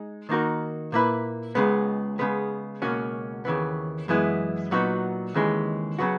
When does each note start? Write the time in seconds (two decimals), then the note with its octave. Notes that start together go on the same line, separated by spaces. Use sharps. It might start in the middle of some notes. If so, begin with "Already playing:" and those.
Already playing: G#3 D#4
0.29 D#3 A#3 D#4 F#4 A#4
0.92 A#2 A#3 E4 B4
1.55 C#2 C#3 G#3 B3
2.19 C#3 G#3 B3
2.82 C#2 B2 A#3 C#4 F#4
3.45 D#2 C#3 E3 B3
4.08 F#2 E3 G#3 B3 E4
4.71 A#2 F#3 B3 D#4 F#4
5.34 D#2 C#3 E3 G#3
5.99 C#3 F#3 B3 F#4